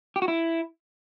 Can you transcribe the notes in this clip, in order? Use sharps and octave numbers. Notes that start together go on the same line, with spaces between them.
G4
F#4
E4